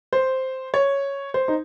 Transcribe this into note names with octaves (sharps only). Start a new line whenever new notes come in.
C5
C#5
C5
D#4